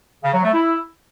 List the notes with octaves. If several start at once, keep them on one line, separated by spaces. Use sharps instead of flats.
C#3
F#3
A3
E4